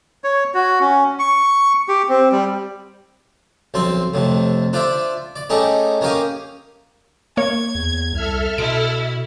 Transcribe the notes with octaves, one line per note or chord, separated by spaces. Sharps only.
C#5
F#4
C#4
C#6
G4
C4
G3
B1 F3 C4 C6
F2 A2 C3
D4 F4 C5 D5 E5
D5
A3 C#4 D#4 G4 G#4
A#3 C#4 G4 F5 D#6
A#3 C#5 G#6
E2
C2 A4 E5 F6
B2 E4 D7